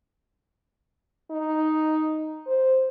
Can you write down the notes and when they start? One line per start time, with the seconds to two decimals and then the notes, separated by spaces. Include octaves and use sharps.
1.31 D#4
2.47 C5